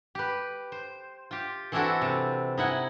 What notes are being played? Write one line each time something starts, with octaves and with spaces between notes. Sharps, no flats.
G4 B4
C5
F4 G4
E3 C4 D4 E4 F#4 A4
C3
D#4 E4 F#5 G#5